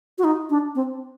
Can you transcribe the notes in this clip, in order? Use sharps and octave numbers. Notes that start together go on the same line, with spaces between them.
F#4
D#4
D4
C4